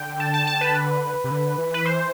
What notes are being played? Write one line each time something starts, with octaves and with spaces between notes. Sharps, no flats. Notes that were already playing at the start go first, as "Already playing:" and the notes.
Already playing: D3 G5
A5
A5
A5
B4
C3
D3
E3
B4
C5